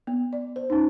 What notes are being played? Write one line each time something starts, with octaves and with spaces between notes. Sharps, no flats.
B3
D5
C5
C#4 D#4